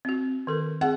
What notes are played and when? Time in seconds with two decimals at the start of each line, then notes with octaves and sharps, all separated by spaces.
0.05 C4 F#4
0.47 D#3 A4 A#4
0.81 C4 G#4 F#5